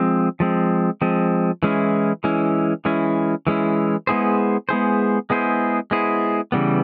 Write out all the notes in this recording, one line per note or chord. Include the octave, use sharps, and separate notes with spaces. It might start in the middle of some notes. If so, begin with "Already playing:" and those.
Already playing: F3 G#3 C4
F3 G#3 C4
F3 G#3 C4
E3 G#3 C#4 E4
E3 G#3 C#4 E4
E3 G#3 C#4 E4
E3 G#3 C#4 E4
G#3 B3 E4 G#4 C5
G#3 B3 E4 G#4 C5
G#3 B3 E4 G#4 C5
G#3 B3 E4 G#4 C5
C#3 E3 G3 B3